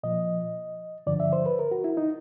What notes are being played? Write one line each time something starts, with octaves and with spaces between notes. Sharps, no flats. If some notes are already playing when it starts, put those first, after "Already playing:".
A#2 F3 D#5
G2 D3 F3 D5
E5
C5
B4
A#4
F#4
E4
D#4